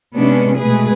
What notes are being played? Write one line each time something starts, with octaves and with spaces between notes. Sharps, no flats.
C3 G#3 B3 C#4 D4
B2 G#3 A3 G#4 B4